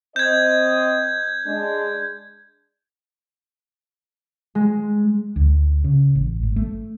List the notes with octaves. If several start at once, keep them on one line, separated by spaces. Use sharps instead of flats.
C4 D#5 G6 G#6
G#3 D4
G#3
D2
C#3
A1
G#1
A3